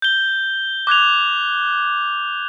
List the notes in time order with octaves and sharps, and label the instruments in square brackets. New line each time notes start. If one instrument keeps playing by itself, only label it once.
[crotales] G6 G7
D6 F#6 G#6 F7